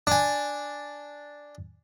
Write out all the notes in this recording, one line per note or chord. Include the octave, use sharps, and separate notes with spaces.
D4 G#5